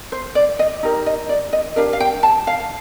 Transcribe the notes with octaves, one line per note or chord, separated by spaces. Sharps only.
C5
D5
D#5
D#4 G4 A#4
D#5
D5
D#5
D4 G4 A#4 F5
F5
G5
A5
F5